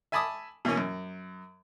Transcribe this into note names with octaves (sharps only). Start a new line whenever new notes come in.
E5 G#5 A5 B5 D6 D#6
B2 E3 A#3 C#4
F#2